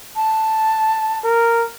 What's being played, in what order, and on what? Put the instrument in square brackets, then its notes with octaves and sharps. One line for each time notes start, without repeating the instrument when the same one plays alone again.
[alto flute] A5
[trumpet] A#4